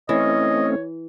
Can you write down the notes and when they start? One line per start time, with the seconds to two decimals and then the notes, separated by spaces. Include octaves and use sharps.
0.09 E3 A3 C4 C#4 C#5 D#5